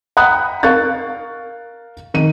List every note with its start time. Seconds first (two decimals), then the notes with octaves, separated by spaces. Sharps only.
0.17 F#5 G5 A#5 B5 D#6 F#6
0.63 A#4 F5 C#6 F#6 A6
2.14 D#3 D#7